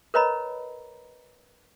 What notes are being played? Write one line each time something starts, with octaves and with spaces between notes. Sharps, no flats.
A#4 B4 C#5 D#5 A#5 B5